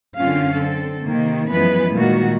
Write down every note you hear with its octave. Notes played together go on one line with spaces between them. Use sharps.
F#2 D3 C4 C#4 F4 F5
D3 C4 A4
C3 D#3 A#3
F#2 E3 F3 G#3 B3 B4
A#2 D#3 G3 G#3 F#4